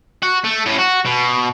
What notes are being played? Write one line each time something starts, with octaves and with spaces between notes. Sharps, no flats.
F#4
A3
A2 C#4
F#4
B2